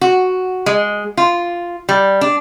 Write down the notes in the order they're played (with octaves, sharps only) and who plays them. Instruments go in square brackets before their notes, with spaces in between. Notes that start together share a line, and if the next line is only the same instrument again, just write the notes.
[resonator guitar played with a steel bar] F#4
G#3
F4
G3
D4